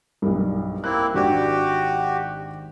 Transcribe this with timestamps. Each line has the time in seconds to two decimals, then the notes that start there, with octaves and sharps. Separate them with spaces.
0.22 B1 G2
0.84 A#3 C4 E4 F#6
1.15 G#1 D4 F#4 G4 G5